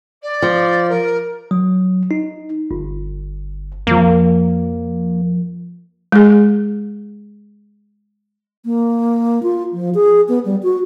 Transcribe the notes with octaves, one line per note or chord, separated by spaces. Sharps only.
D5
F3
A#4
F#3
D#4
G1
F2 F3 A#3
G#3 G#4
A#3
F4
F3
G#4
B3
G3
F#4